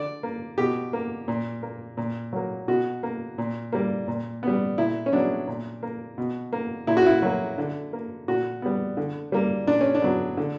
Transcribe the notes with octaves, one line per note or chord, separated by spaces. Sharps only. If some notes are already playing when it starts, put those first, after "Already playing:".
Already playing: D3 D5
A#3
B2 G4
A#3
A#2
A#3
A#2
F#3 A#3
B2 F#4
A#3
A#2
G3 A#3
A#2
G3 B3
A#2 E4
C#4
F#3 B3 D4
A#2
A#3
B2
A#3
A#2 E4
F#4
E4
F#3 A#3
D3
A#3
A#2 F#4
G3 B3
D3
G3 A#3
A#2 D4
C#4
D4
F#3 B3
D3